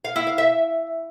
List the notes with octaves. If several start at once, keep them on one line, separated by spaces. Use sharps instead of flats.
F5
E4
F5
E5